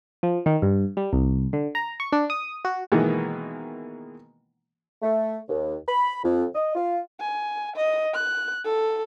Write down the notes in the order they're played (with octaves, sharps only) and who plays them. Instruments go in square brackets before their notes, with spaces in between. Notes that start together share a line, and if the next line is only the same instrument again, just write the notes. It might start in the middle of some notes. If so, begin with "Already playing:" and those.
[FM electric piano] F3
D#3
G2
G3
C2
D3
A#5
C#6
D4
D#6
F#4
[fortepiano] B2 D#3 E3 G#3 A#3 B3
[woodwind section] A3
D#2
B5
F2
D#5
F4
[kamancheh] G#5
D#5
F#6
A4